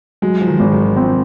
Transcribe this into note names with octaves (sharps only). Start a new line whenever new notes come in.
F#3 G#3
F3
D#3
G#1
F3
D#3
F3 C4